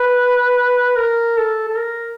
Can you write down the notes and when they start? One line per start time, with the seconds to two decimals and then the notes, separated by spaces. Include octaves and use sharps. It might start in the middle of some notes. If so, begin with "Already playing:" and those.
Already playing: B4
0.97 A#4
1.38 A4
1.68 A4
1.77 A#4